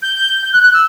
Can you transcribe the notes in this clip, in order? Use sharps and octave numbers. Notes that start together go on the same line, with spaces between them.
G6
G6
F#6
F#6
E6